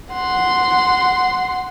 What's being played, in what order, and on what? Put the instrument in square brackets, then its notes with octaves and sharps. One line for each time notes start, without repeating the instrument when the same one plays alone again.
[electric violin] F#5 C6